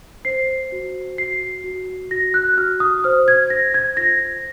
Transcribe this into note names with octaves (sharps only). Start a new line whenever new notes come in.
C5 C7
F#4
F#4 C7
F#4
F#4 A#6
F#6
F#4 F6
D#6
C5 F6
G#6
C5 A#6
G#6
F4 A#6